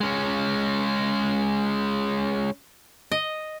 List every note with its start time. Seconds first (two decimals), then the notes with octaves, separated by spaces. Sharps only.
0.01 G#3 C#4
3.12 D#5